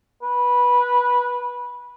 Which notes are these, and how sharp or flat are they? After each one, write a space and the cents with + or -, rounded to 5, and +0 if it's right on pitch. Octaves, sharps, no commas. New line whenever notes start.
B4 -15